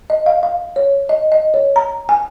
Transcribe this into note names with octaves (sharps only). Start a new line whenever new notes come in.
D#5
F5
F5
C#5
D#5
D#5
C#5
A#5
G#5